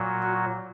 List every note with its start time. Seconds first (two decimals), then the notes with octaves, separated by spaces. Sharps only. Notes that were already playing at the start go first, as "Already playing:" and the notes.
Already playing: A#2 F#3
0.23 F#4